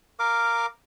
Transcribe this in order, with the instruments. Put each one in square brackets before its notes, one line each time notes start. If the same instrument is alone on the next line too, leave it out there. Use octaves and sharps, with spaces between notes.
[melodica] A#4 F5 D6